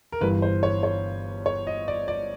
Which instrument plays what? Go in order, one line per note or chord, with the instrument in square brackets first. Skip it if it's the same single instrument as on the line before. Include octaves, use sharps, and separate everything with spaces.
[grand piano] A#4
G1 G2 E3 G3 B4
C5
C#5
C#5
C#5
D#5
D5
D5